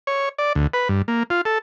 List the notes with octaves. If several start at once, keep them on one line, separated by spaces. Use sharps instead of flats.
C#5
D5
D2
B4
G2
A#3
F4
A4